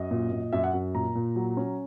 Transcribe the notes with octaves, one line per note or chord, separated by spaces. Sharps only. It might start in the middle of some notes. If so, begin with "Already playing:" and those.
Already playing: F#2 D#5
A#2
A#2
F#2 E5
F#5
F#2
A#2 A#5
A#2
F#3
C#4